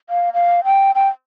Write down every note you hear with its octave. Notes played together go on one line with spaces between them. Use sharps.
F5
F5
G5
G5